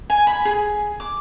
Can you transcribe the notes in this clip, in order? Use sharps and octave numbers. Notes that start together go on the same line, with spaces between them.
G#5
B5
G#4
D6